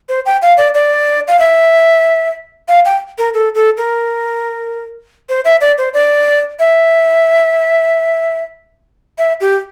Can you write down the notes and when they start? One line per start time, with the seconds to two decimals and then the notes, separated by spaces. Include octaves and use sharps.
0.09 C5
0.26 G5
0.42 F5
0.57 D5
0.75 D5
1.28 F5
1.39 E5
2.68 F5
2.85 G5
3.18 A#4
3.34 A4
3.55 A4
3.77 A#4
5.29 C5
5.45 E5
5.61 D5
5.78 C5
5.94 D5
6.59 E5
9.18 E5
9.41 G4